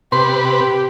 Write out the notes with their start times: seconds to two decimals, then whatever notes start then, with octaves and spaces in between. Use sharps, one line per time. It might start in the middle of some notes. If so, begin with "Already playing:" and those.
0.12 C3 G4 B4 C6
0.46 G4